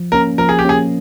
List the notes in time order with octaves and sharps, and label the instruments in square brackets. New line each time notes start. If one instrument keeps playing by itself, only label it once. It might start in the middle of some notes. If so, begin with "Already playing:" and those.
Already playing: [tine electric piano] F3
[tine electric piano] A#3 C#4 [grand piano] A#4
[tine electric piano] F3 [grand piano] A#4
[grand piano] G#4
G4
[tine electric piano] A#3 C#4 [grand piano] G#4